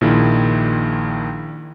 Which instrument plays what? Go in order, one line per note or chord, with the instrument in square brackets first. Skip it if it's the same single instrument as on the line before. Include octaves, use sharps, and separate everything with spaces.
[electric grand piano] A#1 A#2 D#3 D4 E4 G#4